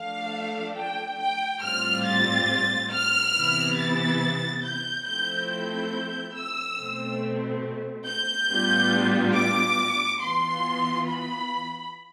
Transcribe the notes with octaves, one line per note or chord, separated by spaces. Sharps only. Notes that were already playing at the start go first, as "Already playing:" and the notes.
Already playing: F3 A3 D4 F5
G5
G5
A2 G3 C4 F4 F6
A6
F6
C3 E3 B3 E4
A6
G6
F3 A3 C4 E4 G6
G6
E6
B2 A3 C4
G6
A2 G3 B3 D4 F4
D6
E3 B3 F4 C6
B5